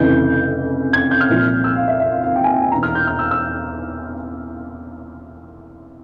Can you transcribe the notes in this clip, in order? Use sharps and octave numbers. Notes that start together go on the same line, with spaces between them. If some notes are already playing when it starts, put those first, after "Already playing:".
Already playing: F1 F2 C#3 E3 G6
G#6
G6
F6
C2 A#2 F3
E6
F5
E5
E5
F5
F5
G5
G#5
G5
G#5
E1 E2 E3 A#5
F6
G6
F6
E6
E6